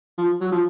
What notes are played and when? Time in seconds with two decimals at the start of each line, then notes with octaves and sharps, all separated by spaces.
0.18 F3
0.41 F#3
0.52 F3